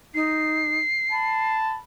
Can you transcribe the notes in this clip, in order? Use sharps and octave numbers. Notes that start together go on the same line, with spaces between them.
D#4 C7
A5 B5